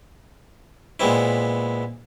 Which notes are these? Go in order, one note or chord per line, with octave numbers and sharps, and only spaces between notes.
A#2 G#3 B3 C4 E4